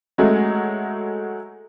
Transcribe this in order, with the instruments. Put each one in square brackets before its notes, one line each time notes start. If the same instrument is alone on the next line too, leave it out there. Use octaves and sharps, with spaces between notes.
[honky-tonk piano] F#3 G#3 A3